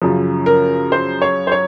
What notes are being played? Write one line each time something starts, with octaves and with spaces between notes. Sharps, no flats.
F#2 C#3 F3
A#4
C5
C#5
C5
C#5